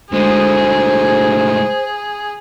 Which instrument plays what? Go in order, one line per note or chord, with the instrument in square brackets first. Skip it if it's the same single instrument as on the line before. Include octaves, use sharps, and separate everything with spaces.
[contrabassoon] D2 [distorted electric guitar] A2 G#3 [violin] G#4 [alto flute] C5